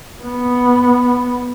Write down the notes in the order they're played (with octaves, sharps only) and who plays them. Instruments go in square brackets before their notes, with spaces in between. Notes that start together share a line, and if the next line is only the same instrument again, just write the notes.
[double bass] B3